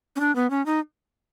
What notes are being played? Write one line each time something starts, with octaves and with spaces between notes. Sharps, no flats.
C#4
D4
B3
C#4
D#4